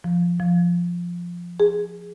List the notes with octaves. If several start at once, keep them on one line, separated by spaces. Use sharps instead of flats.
F3
F3
G#4